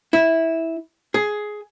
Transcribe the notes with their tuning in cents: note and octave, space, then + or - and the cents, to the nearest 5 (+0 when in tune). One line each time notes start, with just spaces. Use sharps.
E4 -10
G#4 +10